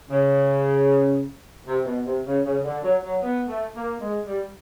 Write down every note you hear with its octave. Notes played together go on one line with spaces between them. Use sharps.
C#3
C3
B2
C3
C#3
C#3
D3
F#3
F#3
B3
A3
A#3
G#3
G3